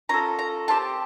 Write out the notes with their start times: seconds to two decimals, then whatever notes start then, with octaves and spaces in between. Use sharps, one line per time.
0.09 C#4 F4 A4 A#5
0.39 A#5
0.68 C4 D#4 G4 A5